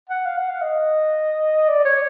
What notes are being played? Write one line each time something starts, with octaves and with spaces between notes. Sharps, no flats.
F#5
F5
F#5
F5
D#5
D5
C#5